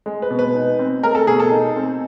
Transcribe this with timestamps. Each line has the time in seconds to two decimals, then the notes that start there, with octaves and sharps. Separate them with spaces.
0.06 G#3
0.22 B4
0.30 B2
0.39 B4
0.55 D#4
0.79 C4
1.03 G#3 A#4
1.15 A4
1.27 B2 G#4
1.39 A4
1.52 D#4
1.76 C4